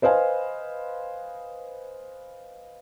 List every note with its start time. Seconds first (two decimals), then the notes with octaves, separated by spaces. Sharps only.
0.02 B4 C5 D#5 F5 G#5